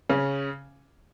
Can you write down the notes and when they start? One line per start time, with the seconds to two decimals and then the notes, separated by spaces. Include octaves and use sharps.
0.09 C#3 C#4